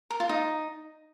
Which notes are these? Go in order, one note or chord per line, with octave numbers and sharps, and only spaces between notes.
A#4
F4
D#4